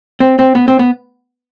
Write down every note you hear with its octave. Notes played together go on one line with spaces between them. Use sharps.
C4
C4
B3
C4
B3